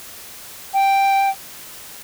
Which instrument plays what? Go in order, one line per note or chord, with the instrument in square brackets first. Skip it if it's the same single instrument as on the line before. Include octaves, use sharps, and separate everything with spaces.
[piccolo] G5